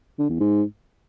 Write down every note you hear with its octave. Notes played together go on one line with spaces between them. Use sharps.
D3
E2
G#2